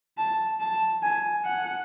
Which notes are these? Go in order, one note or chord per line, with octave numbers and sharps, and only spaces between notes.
A5
A5
G#5
F#5